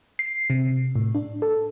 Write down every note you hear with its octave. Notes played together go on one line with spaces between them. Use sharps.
C7
C3
A2
D4
A4